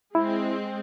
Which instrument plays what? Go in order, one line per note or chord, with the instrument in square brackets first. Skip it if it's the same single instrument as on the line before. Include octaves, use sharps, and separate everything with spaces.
[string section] G#3 C4 [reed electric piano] E4